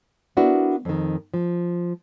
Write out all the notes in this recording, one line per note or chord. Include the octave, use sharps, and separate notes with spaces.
B3 D4 E4 F#4 A#4 B4
F2 D#3
F3